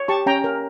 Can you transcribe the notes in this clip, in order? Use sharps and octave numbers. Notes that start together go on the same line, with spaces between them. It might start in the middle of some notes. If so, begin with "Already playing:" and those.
Already playing: C#5
G4 A5 C#6
C#4 G5 A#5
A#4